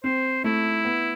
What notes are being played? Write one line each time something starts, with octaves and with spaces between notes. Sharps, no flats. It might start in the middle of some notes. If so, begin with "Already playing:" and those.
C4 C5
A3 E4
B3